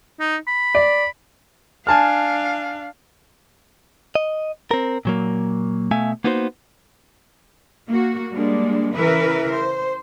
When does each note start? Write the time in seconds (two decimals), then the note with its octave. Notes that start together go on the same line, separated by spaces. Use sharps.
0.20 D#4
0.47 B5
0.75 D5
1.87 D4 F5 G#5 A5 F6
4.15 D#5
4.71 C4 A#4
5.05 A#2 F#3 A#3
5.91 B2 A3 E5 F5 G#5
6.24 A#3 B3 D#4 F#4 C5
7.88 A#3 F#4
8.32 G3 G#3 A#3 D4
8.95 C#3 E3 A#4 B4 E5
9.50 C5